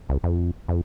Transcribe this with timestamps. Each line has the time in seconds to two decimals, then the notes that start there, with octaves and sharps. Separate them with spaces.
0.09 C#2
0.23 F2
0.68 F2